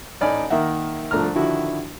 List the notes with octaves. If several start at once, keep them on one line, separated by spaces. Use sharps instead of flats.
A1 D#4 D5 G#5 B5 F6
D#3 A#3 E5 F#5
C2 F3 A3 D4 A#5 F6
D3 D#3 F3 E4 F#4